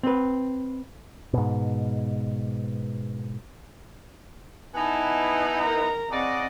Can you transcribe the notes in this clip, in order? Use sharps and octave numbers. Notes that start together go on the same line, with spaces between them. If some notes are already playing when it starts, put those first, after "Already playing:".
C4 B4
G#2 B2
B3 D#4 E4 G#5 A5
A#4 A#5
C#3 C4 D5 D#5 F#5